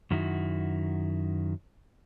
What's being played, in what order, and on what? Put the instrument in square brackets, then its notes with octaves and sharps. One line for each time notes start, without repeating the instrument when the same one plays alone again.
[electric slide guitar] F#2 D#3 E4 F#4